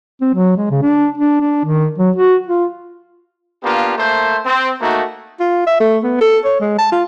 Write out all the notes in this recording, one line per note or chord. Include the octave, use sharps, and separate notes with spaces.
C4
F#3
G#3
C#3
D4
D4
D4
D#3
F#3
F#4
F4
A#3 B3 D4 F4 G4
A3 A#3 C5
C4
A3 A#3 D#4 F#4
F4
E5
A3
B3
A4
C#5
G#3
A5
F4